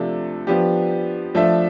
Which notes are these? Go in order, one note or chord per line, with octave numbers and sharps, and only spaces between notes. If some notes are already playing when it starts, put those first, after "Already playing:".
Already playing: C3 F3 A3 D4 A4
F3 B3 D4 G4
F3 A3 D4 A4 E5